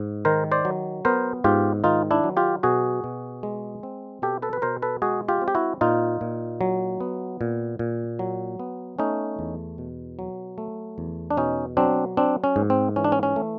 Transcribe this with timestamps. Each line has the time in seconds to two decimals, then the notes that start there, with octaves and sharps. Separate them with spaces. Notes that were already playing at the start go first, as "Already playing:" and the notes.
Already playing: G#2
0.25 D#3 A#4 C5
0.52 C5 D5
0.65 F#3
1.05 B3 A#4 C5
1.44 G#2 F4 G4
1.84 D#3 D#4 F4
2.11 D4 E4
2.24 F#3
2.37 F4 G4
2.63 B2 F#4 G#4
3.04 B2
3.43 G#3
3.83 C4
4.22 B2 G4 A4
4.42 A4 B4
4.53 B4
4.62 B2 A#4 C5
4.82 A4 B4
5.02 G#3 F#4 G#4
5.28 F4 G4
5.42 C4
5.48 G4
5.55 E4 F#4
5.81 A#2 D#4 F4
6.21 A#2
6.61 F#3
7.01 B3
7.41 A#2
7.79 A#2
8.19 F#3
8.59 B3
8.99 A3 C#4 D#4
9.39 E2
9.78 B2
10.19 F#3
10.58 A3
10.98 E2
11.31 D4
11.37 B2 C#4 D#4
11.77 F#3 C4 D4
12.17 C4 D4
12.44 C#4
12.56 G#2
12.70 C4
12.96 E3 C#4
13.04 D4
13.12 C#4
13.23 C#4
13.36 A3